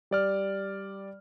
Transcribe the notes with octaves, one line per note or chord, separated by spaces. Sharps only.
G3 D5 F6